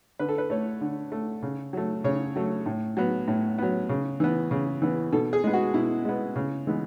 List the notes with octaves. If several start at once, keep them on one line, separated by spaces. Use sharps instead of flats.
D3 B4
A4
B4
A3 C#5
D3
A3
C#3
F#3 A3
C#3 C#5
F#3 A3
A2
F#3 B3
A2
F#3 B3
C#3
E3 B3
C#3
E3 B3
B2 A4
G#4
G#3 B3
F#4
B2 E4
G#3 B3
C#3
E3 G#3 B3